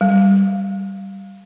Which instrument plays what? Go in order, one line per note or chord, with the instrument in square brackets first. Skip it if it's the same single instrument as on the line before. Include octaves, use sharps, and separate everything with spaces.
[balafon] G3